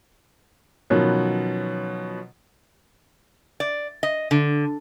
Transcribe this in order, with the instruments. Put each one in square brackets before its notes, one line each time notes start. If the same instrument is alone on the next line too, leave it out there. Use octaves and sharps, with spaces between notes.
[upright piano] B2 D#3 F3 F#3 B3 C#4
[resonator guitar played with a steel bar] D5
D#5
D3